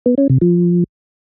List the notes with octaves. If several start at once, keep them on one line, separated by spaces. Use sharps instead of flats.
B3
C#4
C3
F3